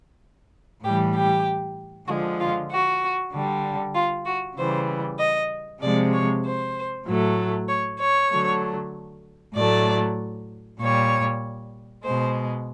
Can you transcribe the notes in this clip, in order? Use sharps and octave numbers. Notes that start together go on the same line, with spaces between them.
A2 E3 G3 G4
G4
D3 F3 G#3 F#4
F4
F#4
D3 G3
F4
F#4
C#3 E3 G3 C5
D#5
C3 F3 G#3 D5
C#5
C5
A2 F#3 A3
C#5
C#5
D3 F#3 A3
A2 F#3 A3 D5
A#2 G3 C#5
B2 G#3 C5